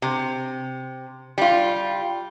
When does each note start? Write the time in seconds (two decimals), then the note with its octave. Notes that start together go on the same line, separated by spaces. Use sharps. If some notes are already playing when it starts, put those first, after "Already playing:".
0.02 C3
1.38 G3 F4